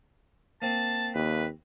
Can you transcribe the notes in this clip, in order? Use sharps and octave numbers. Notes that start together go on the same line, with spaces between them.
A#3 C4 A5
D#2 B4